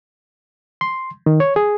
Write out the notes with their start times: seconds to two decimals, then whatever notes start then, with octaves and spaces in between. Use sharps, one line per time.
0.81 C6
1.26 D#3
1.40 C#5
1.56 G#4